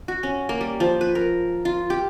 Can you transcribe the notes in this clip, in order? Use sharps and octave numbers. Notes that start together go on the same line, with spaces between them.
F#4
C#4
A#3
G3
F3
B4
A#4
F4
G4